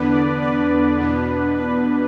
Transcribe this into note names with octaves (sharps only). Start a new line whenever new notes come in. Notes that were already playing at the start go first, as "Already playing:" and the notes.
Already playing: E2 D3 B3 D4 B4
D5
B4
E2 B2 B3 D4
B4